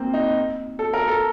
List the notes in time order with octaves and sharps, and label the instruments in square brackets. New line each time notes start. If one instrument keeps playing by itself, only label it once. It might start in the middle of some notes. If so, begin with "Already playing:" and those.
Already playing: [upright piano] A#3 C4
D#4
A4
A#4
A4